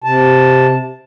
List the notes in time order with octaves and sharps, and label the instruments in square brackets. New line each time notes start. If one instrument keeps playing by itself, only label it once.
[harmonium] C3 A5